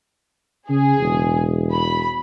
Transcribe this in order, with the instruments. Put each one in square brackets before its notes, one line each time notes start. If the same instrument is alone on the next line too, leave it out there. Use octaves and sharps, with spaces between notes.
[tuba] C#3 [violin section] G#4
[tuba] E1
[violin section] B5